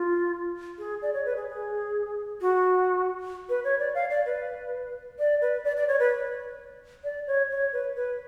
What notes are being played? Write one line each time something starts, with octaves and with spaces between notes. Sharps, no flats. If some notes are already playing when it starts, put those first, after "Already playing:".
Already playing: F4
G#4
D5
C#5
B4
G#4
G#4
F#4
B4
C#5
D5
F5
D5
B4
D5
B4
D5
D5
C#5
B4
D5
C#5
C#5
B4
B4